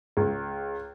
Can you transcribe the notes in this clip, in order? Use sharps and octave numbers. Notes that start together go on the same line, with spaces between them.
C#2